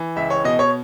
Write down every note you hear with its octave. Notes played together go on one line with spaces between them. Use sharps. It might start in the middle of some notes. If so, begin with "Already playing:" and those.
Already playing: E3
C#2 E5
C#5
B2 D#5
C#5